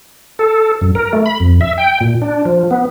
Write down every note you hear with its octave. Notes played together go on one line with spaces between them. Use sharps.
A4
F#2
A#4
A3
B5
F2
E5
G5
A#2
D4
F3
B3